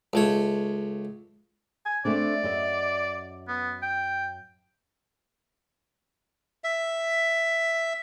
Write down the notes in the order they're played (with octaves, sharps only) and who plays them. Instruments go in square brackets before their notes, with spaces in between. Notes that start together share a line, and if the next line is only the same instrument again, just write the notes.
[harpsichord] C#2 A3 C#5
[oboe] G#5
[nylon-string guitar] A3 C4 D4 [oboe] D5
[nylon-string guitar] F#2 D#5 E5
[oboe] B3
G5
[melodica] E5